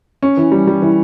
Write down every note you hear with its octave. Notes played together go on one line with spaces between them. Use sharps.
C#4
E3
G3
G3
E3